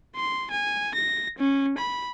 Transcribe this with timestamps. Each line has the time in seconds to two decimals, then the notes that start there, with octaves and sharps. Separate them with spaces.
0.15 C6
0.51 G#5
0.95 A#6
1.38 C#4
1.78 B5